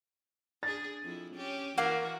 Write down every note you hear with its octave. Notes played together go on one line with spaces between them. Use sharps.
D4 G#4 A6
F2 E4
C#4 G4
E3 A#3 F#4 F5 F#5